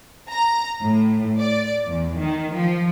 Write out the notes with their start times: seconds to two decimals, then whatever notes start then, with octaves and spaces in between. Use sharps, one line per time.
0.31 A#5
0.82 A2
1.38 D5
1.88 E2
2.18 D#3
2.54 F3